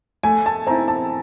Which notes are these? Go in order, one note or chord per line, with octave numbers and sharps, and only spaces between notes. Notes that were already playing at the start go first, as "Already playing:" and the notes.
A3 G#5
A5
C4 E4 A#5
A5